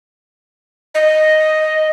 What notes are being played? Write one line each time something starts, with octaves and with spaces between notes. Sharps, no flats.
D#5